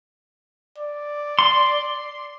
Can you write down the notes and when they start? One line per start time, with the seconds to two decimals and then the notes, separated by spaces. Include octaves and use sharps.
0.78 D5
1.39 C6